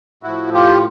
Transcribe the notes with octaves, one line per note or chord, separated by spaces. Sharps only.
A2 F3 E4 F#4
F4 G4